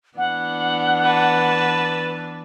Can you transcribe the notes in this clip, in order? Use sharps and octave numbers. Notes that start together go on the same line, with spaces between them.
E3 B3 D4 F#5
B4 A5